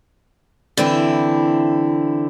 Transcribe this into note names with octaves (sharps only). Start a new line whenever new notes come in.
D3 E3 C4 E4 G5